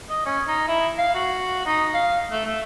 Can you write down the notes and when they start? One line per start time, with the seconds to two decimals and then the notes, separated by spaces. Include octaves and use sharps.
0.10 D#5
0.26 C#4
0.48 D#4
0.68 E4
0.98 F5
1.14 F#4
1.66 D#4
1.94 F5
2.31 A3
2.45 A3